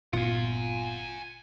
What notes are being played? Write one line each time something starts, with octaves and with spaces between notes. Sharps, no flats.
G1 A#2 B3 F4 F#5 G#5